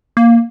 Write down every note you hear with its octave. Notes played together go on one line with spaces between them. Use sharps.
A#3